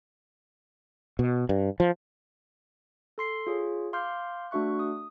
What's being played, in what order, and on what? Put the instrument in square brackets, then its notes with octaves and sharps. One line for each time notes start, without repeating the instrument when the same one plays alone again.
[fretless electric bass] B2
G2
F3
[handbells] A4 C6 C7
F4 G#4 C#5
F5 C6 D6 F6 G6
A3 D4 F#4 E5 C#6 F#6
D#6